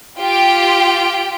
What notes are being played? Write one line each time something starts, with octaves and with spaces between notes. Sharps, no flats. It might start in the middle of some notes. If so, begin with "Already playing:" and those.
F4 G4 G5